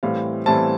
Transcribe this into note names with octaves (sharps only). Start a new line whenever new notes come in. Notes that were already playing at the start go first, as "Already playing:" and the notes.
A2 E3 G3 C4 F5
A2 E3 G3 C4 A5